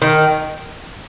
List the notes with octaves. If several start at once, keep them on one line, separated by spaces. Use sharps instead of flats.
D#3